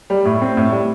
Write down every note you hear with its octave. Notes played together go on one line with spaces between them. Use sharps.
G3
A2
C4
A2
G3